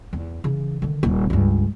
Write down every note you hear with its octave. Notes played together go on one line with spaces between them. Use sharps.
E2
C#3 E3
D3 D#3
D#1
C#2 G2